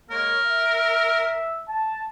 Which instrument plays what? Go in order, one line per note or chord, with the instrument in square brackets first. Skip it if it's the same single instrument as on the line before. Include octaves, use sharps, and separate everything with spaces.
[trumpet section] G#3 A#3 C#5 [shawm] A#4
[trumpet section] E5
A5